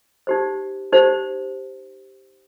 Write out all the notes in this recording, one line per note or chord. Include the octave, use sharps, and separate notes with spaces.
D#4 G4 C5
D#4 G4 C5